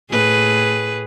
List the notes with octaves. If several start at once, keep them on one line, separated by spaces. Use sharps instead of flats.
A2 G#4 B4